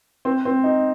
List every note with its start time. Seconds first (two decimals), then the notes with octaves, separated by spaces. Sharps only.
0.25 C4
0.45 C4
0.64 D#4